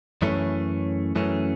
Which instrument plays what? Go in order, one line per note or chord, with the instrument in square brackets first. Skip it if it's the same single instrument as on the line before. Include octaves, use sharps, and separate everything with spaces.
[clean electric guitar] F#2 E3 A3 C#4
F#2 E3 A3 C#4